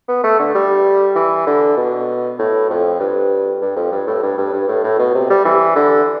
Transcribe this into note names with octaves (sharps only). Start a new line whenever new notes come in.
B3
A3
D3
G3
E3
D3
B2
A2
F2
G2
G2
F2
G2
A2
G2
G2
G2
A2
A2
B2
C3
G3
E3
D3